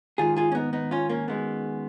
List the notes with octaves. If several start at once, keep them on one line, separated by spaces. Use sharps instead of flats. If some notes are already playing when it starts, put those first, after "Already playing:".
G#2 D#3 F4 G#4
F4 G#4
C#4
B3 D#4
B3 D#4
C#4 F4
A#3 C#4
F#2 D#3 G#3 B3